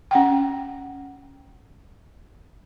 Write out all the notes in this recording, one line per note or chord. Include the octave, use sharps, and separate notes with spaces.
C#4 F#5 G5